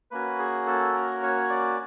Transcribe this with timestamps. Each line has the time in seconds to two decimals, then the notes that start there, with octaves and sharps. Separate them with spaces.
0.11 A#3 C#4 F#4 B4
0.39 G#4
0.67 A4
0.94 A#4
1.23 C#5
1.50 D5